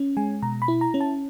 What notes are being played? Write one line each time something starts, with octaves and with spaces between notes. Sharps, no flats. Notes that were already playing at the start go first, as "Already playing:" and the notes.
Already playing: C#4
G#3 G#5
B2 A#5
B5
E4
A#5
C#4
A5